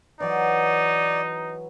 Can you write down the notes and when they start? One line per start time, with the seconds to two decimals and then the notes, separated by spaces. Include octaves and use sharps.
0.20 E3 F#3 D#4 D5